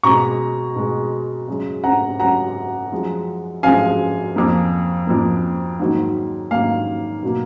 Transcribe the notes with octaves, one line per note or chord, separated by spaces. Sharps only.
B2 G#3 A#5 C#6
B2 G#3
F#2 C#3 G#3
F#5 A#5
F#2 C#3 G#3 F#5 A#5
F#2 F3 G#3
F#2 F3 G#3 F5 G#5
F2 F3 A#3
F2 F3 A#3
G#2 D#3 F#3 A#3
G#2 D#3 F#3 A#3 F5
B2 F#3 A#3